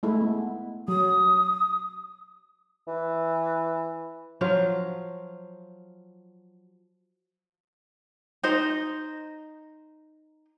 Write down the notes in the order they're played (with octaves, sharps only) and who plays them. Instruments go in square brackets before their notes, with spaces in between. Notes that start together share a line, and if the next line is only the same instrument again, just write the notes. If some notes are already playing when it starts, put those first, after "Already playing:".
[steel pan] G#3 A3 E4
B3
[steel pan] F#3 [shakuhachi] D#6
[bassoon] E3
[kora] F3 F#3 F4 F5
[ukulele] D#4 C5 D#5